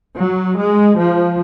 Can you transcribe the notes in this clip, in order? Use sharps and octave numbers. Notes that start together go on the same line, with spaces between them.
F#3
G#3
F3